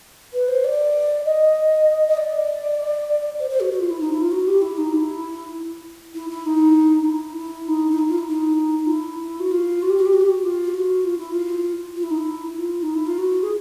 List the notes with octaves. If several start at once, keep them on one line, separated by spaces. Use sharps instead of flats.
B4
C5
D5
D#5
D#5
D5
C5
C5
F#4
F#4
F4
E4
D#4
E4
F4
F#4
G4
E4
D#4
E4
E4
E4
D#4
E4
E4
D#4
D#4
E4
F4
E4
D#4
F4
E4
F#4
F4
F#4
G4
F#4
G4
F#4
G4
F#4
F4
F#4
F4
E4
F4
F4
E4
D#4
E4
F4
D#4
E4
F4
F#4
G#4